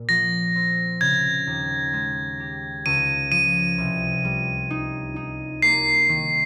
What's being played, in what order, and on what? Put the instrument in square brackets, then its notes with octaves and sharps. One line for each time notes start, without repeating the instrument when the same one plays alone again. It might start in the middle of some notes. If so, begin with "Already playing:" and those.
Already playing: [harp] A#2
[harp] F3 [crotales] A#6
[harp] C4
[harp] C#3 [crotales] G#6
[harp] D#2
G#3
G4
[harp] C#2 [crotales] D#7
[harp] F3 [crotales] D#7
[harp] C2
G3
D#4
D#4
[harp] A#3 [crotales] C7
[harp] D#3